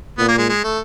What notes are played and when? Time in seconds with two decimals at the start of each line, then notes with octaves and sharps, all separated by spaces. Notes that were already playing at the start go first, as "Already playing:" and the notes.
0.18 A#2 B3
0.28 A#3
0.38 G#3
0.49 G#3
0.64 A3